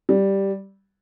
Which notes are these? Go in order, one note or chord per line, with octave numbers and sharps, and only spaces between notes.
G3